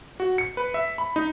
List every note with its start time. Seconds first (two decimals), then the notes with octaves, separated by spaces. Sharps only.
0.20 F#4
0.38 C#7
0.57 B4
0.74 E5
0.98 B5
1.16 D#4